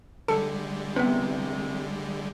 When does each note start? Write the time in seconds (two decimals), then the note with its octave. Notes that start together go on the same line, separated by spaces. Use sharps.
0.28 D3 G3 G#3 A4 A5 C#7
0.96 C2 C3 B3 B4